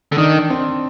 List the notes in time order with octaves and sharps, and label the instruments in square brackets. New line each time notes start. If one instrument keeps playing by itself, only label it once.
[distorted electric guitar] D3
[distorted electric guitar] D#3 [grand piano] D4
[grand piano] C4